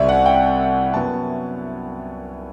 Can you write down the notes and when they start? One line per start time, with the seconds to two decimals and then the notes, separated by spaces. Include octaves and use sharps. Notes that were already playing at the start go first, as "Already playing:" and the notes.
Already playing: C2 C3 G3 C4 D5 E5
0.09 F#5
0.26 G5
0.93 F#2 F#3 B3 A5